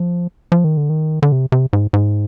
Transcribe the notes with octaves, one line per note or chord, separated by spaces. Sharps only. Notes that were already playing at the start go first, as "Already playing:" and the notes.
Already playing: F3
F3
D#3
D3
D#3
D3
C3
C3
G#2
G#2